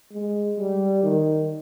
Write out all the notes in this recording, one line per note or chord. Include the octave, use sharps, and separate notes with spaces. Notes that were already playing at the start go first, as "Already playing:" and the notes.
G#3
G3
D#3